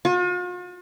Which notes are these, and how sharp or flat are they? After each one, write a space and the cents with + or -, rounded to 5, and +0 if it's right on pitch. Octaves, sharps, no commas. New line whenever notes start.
F4 +45